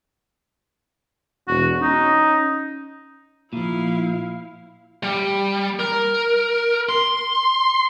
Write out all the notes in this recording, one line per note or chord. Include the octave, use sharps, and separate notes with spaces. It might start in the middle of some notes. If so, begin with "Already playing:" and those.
E1 F#4
C#4 D#4
A#2 F3 E4 F5
G3
A#4
C6